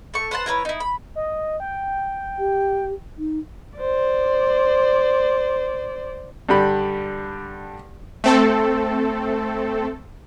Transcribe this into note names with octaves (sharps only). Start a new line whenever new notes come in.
A3 C#6
B4 C5 F#5 A5
E4 A#4 B4 C#5
D#4 E4
B5
D#5
G5
G4
D#4
C5 D5
G2 D3 G4 B5
A3 C4 A4